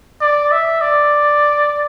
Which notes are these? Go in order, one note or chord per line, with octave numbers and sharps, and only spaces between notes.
D5
E5
D5